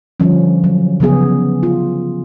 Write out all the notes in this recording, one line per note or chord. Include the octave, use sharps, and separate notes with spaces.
D3 F3 G3 C#4
F#3
C#3 F3 B3 G#4
F4